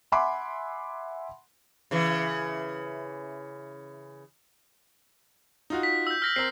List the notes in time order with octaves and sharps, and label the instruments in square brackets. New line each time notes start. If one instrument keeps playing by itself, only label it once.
[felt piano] E5 F#5 G#5 B5 C6 D6
[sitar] C#3 E3
[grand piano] D#4 F4 F#4
[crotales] B6
E6 G6
F6 A#6 B6
[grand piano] C4 A#4 [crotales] E6 C7